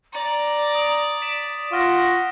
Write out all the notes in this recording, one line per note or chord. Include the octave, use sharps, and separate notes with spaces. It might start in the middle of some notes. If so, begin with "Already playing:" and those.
D5 A#5
D#6 D7
B6 D7 E7
F4 F#5 C#6 F6 A#6